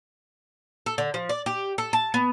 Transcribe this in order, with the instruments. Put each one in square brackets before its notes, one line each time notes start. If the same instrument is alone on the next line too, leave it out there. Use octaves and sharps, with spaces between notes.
[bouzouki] A4
D3
F3
D5
G4
A4
A5
B3